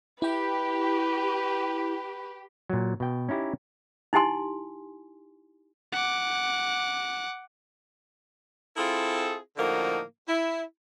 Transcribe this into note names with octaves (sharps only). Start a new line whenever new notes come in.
E4 G4 B4 G5
A#2 F#3
B2 G5
C#4 D#4 E4 G4
D#4 E4 G4 G#5 C6
F#5 D6
C4 E4 F4 G#4 A4
A2 D3 F3 A#3 D#4 F#4
E4